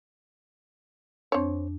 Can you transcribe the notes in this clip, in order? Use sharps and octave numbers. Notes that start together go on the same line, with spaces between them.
F2 C4 D4 C#5